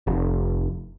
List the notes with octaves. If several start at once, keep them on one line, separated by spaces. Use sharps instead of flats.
F1